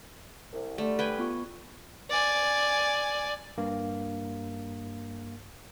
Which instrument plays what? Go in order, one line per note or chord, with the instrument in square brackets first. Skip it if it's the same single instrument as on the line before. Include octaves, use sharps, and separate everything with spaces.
[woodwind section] C2
[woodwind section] D3 G3 [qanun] A3
[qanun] B4 G5 G#5
[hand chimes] B3 F4 C#6
[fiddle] D5 G#5
[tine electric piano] G2 A#3